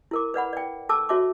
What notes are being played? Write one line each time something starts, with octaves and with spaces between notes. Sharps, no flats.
E4 A#4 D6
B4 D5 F#5 B5
D5 G5
A4 A5 D6 E6
F#4 C#5 E5 A5 D6